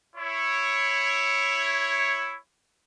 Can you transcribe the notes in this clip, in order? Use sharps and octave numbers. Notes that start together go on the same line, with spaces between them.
E4 C#5